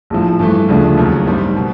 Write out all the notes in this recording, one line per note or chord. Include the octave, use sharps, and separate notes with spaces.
A#1 A2 F3
G2 E3 A3
D2 C#3 F3 A3 D4
D#2 C#3 F#3
A1 G2 D#3 G3 C4
B2